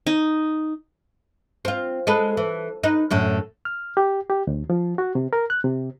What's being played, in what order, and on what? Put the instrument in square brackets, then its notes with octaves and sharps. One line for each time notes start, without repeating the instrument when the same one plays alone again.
[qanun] D#4
[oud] C4 F4
G#3 A4 B4
E3
D#4 B4
F#2 A2 D3
[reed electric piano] F6
G4
G4
D2
F3
F#4
C3
A#4
F#6
C3